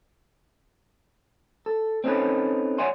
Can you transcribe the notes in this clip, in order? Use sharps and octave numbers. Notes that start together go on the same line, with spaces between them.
A4
C4 C#4 D#4 G4 A4 B4
C#5 D5 E5 F#5 G#5 C6